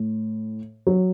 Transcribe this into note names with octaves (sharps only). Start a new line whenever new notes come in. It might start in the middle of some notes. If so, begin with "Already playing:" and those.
Already playing: A2
F#3